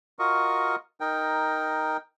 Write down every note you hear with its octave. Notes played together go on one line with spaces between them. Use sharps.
F4 F#4 A#4 D#5 C#6
D#4 A#4 G5